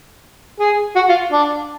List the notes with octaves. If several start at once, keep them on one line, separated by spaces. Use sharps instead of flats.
G#4
F#4
F4
D4